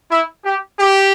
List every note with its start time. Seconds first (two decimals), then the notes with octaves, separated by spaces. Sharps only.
0.11 E4
0.45 G4
0.80 G4